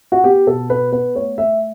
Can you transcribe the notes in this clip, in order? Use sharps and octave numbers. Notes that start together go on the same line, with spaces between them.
F#4
B3 G4
B2 A4
B3 B4
B3 B4
A3 C#5
A3 E5